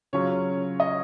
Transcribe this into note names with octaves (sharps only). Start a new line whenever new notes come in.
C#3 F#3 C#4 F4 C#5
D#5